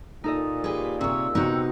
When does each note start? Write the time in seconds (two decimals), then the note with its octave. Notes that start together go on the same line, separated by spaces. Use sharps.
0.24 A#2 D#4 A4 D#5
0.64 G4 G#4 B4
1.01 C3 C#5 E6
1.35 C3 B3 C4 D#4 F#4